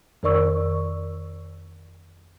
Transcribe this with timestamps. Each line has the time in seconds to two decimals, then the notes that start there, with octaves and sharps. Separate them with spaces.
0.23 F2 D#3 A#4 D5 C#6 E6